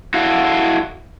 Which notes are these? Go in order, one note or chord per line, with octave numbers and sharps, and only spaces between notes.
E4 F#4 A4 F5